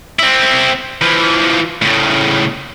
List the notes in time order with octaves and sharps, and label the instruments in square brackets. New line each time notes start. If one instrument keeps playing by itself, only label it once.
[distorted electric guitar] C4 E4
E3 F3
A2 C#3